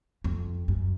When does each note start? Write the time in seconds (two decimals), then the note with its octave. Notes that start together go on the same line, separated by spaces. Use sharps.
0.24 F2
0.68 F#2